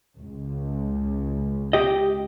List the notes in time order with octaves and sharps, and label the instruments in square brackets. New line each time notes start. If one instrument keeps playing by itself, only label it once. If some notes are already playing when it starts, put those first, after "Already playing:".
[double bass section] C#2
[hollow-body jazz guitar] G4 D#5